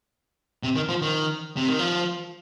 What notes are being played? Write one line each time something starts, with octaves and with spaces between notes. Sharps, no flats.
C3
D#3
F3
D#3
C3
D#3
F3